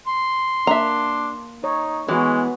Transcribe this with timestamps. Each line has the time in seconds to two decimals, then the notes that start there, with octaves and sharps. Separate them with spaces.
0.07 C6
0.67 A#3 D4 E5 A#5
1.64 D#4 C#5
2.09 E3 G#3 B3 F#4 B4 C#5